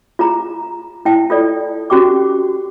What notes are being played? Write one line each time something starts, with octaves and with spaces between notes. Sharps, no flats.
F4 G#4 A#5
E4 G5 A5
F4 A4 D5
C#4 F#4 G4 G5 D6